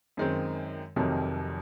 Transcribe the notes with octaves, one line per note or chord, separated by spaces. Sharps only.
F#2 D#3 G#3 C4
F1 F2 C3 D#3 F#3